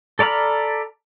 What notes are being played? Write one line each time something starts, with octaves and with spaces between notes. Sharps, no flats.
A4 D5 A#5 B5 F6